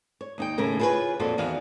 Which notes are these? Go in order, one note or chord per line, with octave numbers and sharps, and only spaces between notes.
C#5
D#2 D#4 G5
D#2 A2 C#3 A#4
E4 F4 G#4 A4 B4 C#5
F2 A#2 F3 F4 F#4 A4
E2 D#3 F#4 F5